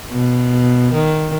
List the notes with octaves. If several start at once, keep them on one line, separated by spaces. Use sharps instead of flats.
B2
D#3